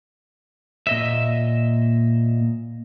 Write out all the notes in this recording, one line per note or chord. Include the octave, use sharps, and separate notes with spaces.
A#2 D#5 E5